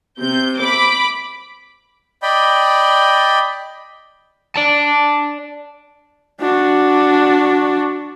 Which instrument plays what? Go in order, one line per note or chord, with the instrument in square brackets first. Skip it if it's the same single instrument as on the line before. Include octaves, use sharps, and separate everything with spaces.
[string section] C3 G6
B5 D6
[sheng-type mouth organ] D5 D#5 G5 B5
[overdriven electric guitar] D5 A5
[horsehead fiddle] D4 F#4